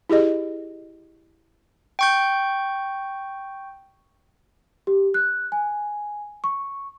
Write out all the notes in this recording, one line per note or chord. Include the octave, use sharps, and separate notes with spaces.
E4 G4 G#4 D#5
G5 C#6 G6
G4
F#6
G#5
C#6